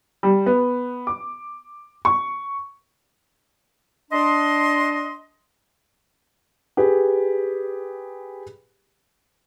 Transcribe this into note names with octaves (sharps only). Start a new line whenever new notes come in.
G3
B3
D6
C#6
D4 D#5 C6
G4 G#4 B4